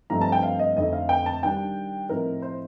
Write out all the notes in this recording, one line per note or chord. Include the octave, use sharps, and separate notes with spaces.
G2 F3 A3 C4 D#4 A#5
A5
G5
F5
D#5
F2 D3 A3 C4 D#4 D#5
F5
G5
A5
D#3 G3 D4 G5
A2 F3 C4 D#4 A#4
C5